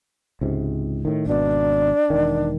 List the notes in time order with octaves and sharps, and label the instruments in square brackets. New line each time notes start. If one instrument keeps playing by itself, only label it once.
[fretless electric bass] C#2 G#2 C3
A2 D#3
[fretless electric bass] G#1 B2 [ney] D4
[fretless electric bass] E1 D#3